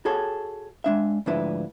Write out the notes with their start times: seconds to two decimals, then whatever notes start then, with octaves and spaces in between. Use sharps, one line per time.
0.05 F#4 G#4 A4 C#5
0.84 G#3 D4 E5
1.26 D2 G#2 F3 D4 E4 B4